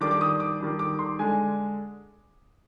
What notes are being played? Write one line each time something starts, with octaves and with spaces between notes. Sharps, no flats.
D#3 G3 D4 D6
D6
D#6
D6
D#3 G3 D4
D6
C6
D3 G#3 D4 G#5